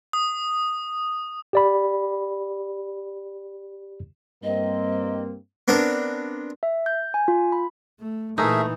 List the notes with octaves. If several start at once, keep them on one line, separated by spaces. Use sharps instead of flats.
D#6
G4 D5 B5
G2 A#3 C4 D#5
B3 C4 D4 A#4
E5
G6
G#5
F4
B5
A3
A#2 E3 A3 D#4 G#4 A#4 E5